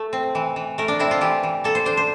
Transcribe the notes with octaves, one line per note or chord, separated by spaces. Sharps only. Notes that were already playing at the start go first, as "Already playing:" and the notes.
Already playing: A3
C4
E3
E3
A3 A#4
D4
C4 E4
F4
E3 G4
E3
A#3 A4
C5
D4 C5
C5